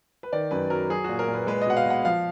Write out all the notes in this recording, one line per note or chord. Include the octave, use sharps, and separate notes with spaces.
B4
D#3 D5
F#2 B4
F#3 A#4
F#3 G#4
A#2 F#4
A#4
A#2
B4
G#3 B4
D#5
B2 F#5
F5
B2 F#5
F3 F5